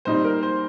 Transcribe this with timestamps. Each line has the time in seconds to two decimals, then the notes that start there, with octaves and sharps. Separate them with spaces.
0.05 A#2 G3 C4 D#4 C5
0.24 A#4
0.43 C5